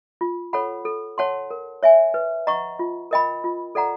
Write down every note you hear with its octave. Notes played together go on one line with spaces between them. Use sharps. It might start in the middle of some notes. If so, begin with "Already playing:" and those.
F4
A4 C#5 F#5 B5
A4
C#5 F#5 A5 C6
A#4
C#5 E5 G#5
B4
D#5 F#5 A#5 C#6
F4
A#4 D#5 G5 B5
F4
A4 D5 F#5 A#5